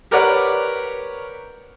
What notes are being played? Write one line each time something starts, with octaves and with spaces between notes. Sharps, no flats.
G4 A#4 B4 C#5 D5 F#5